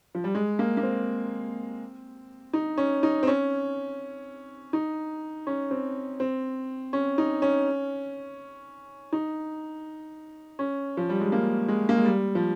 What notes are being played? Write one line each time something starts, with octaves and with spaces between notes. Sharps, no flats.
F3
G3
G#3
A#3
A#3
C4
D#4
C#4
D#4
C4
C#4
D#4
C#4
C4
C4
C#4
D#4
C#4
D#4
C#4
F3
G3
G#3
A#3
G#3
A#3
G#3
G3
F3